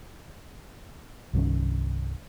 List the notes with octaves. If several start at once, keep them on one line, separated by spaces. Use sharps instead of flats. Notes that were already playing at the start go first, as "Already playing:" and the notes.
C2 G2 D#3 C#4